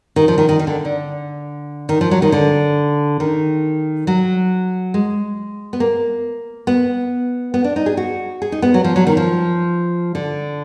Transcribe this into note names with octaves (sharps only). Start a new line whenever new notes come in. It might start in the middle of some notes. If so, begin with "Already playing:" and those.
D#3
F3
D#3
D#3
D#3
D3
D3
D#3
F3
F#3
D#3
D3
D#3
F#3
G#3
B3
A#3
B3
B3
D4
D#4
G#4
F#4
G#4
D#4
B3
F#3
F3
F#3
D#3
F3
D3